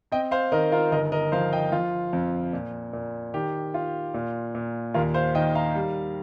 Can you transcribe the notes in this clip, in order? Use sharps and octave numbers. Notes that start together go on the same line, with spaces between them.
C4 D#5 G5
C5 F5
D#3 A#4 D#5
F4 A#4
G1 A#4 D#5
A#4 D#5
F3 C5 F5
D#5 G5
F3 F4
F2
A#2
A#2
D#3 G4
F4
A#2
A#2
D#2 F4 A#4
C5 F5
D#3 D#5 G5
F5 A#5
G3